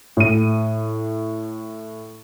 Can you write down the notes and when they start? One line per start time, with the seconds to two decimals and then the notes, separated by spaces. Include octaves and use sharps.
0.17 A2 D#7